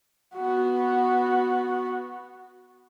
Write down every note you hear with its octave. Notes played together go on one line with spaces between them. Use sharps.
B3 F#4